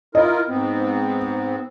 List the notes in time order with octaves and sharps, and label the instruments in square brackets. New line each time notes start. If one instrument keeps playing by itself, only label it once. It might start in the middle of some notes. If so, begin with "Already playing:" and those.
[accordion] E4 F4 A#4 [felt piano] D#5
[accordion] G#2 B3 C4